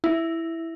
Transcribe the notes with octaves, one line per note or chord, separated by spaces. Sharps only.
E4